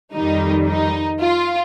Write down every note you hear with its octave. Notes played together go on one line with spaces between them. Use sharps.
F2 D#3 G3 D#4
D#4
F4